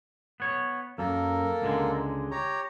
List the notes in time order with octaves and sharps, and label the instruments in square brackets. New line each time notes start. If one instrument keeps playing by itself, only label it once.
[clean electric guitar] B3 C#5
[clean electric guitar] F#2 [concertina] A#3 A4 A#4
[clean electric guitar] C#2 D3 G#3
[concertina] G4 C#5 A#5